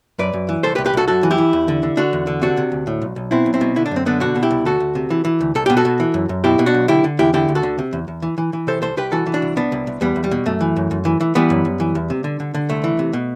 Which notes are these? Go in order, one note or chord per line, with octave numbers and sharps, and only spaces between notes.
F#2 B4 D5
F#2
E3
C2 A4 C5
G4 B4
C2
G4 B4
C2 F#4 A4
F#2 F#4 A4
E3
E4 G4
E3
E2
D3
D3
D3 D4 F#4
E2
D3
C3 D4 F#4
C3
D2
A2
B1
B1
B2 C4 E4
B1
C4 E4
B2
D3 E4
D4
F#2 C4
D3 B3 D4
B2 D4 F#4
B2
E4 G4
C2
D2 F#4 A4
D2
C3
E3
E3
D2
C2 A4
B2 G4
F#4 A4
B2
E3
F#2
F#2
B2 E4 G4
B2
D4 F#4
B1
D3 E4 G4
D3
E2 E4 G4
D3 E4 G4
D2
F#4 A4
D3
C3
E2
E2
E3
E3
E3
C3 A4 C5
C2 A4 C5
C2 G4 B4
E3 F#4 A4
E3
D4 F#4
C2
C2 B3 D4
C2
C2
E2 G3 B3
E2
G3
B2
F#2 A3
E3
F#2
F#2
E3
E3
E3 G3 B3
F#2
F#2
E3
E2
C3
D3
D3
D3
C2 A3
E3
C3
B2